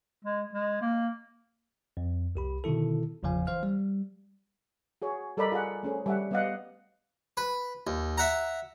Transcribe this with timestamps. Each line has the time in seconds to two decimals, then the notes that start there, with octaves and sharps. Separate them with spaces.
0.24 G#3
0.53 G#3
0.81 A#3
1.97 F2
2.35 C2 G4 B5
2.64 B2 D3 D#3 E4 A4
3.23 G1 E2 C#3 F3 F5 G#5
3.47 E3 C5 F5 F6
3.63 G3
5.02 F#4 G#4 C#5
5.37 G3 A4 A#4 D5 D#5 B5
5.52 F4 G#4 D5 F#5
5.83 A3 C#4 G#4 C5
6.06 G3 E5 F#5
6.31 G3 B3 D5 D#5 F5 F#5
7.37 B4
7.87 D#2
8.18 E5 F#5 A#5